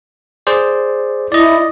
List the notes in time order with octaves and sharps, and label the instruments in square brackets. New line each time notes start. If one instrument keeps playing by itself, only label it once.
[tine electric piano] G#4 C5 D5
[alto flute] E4 [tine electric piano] D5 D#5